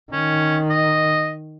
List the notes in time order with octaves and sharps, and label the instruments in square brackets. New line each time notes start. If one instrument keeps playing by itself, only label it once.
[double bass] D#3 [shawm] C#4
[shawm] D#5